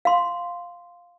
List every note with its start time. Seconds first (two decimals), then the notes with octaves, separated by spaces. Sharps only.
0.05 F5 C6